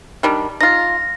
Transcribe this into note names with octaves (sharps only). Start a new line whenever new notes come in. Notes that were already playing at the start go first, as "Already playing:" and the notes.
D#3 G3 D4
D#4 F4 A#6